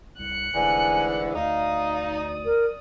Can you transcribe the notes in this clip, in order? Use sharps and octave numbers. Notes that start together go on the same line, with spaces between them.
C2 F#6 C#7
F1 G#2 D3 E3 G#5
D2 D#4 D5 F5 D#6
A#4